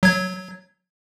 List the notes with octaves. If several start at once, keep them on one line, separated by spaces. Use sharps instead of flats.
F#3 G#6